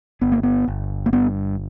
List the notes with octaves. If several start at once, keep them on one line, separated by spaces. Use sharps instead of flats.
G1 B3
A#3
B3
G1
A#3
G2 B3